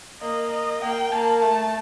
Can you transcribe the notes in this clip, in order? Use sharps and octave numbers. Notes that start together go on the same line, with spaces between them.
A#3 D#5
D#5
A#3 G5
A#3 A5
A3 A5